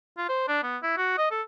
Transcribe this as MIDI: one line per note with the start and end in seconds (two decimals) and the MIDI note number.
0.18 0.26 65
0.29 0.44 72
0.48 0.62 62
0.63 0.77 59
0.83 0.96 64
0.97 1.13 66
1.18 1.27 75
1.31 1.42 69